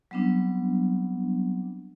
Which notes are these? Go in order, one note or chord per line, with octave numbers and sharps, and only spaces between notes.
F#3 G3 B3 C4 D4